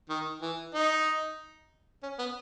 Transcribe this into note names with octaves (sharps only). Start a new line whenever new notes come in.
D#3
E3
D#4
C#4
B3